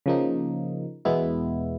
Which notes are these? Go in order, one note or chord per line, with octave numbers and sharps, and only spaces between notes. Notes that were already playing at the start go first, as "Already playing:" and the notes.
C#3 F3 A#3 D#4
E2 B2 G#3 B3 E4